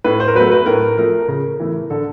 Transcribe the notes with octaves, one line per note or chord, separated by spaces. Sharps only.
A2 B4
C5
A#4
F#3 A3 B4
B4
A2 A#4
F3 A3 A#4
C#3 A#4
E3 A3
D3 A4